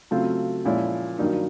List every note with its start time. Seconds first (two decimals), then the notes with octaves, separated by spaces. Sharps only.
0.11 C#3 F#3 A3 C4 F4
0.65 A#2 F3 G#3 C#4 E4
1.18 G2 D#3 F#3 A#3 D#4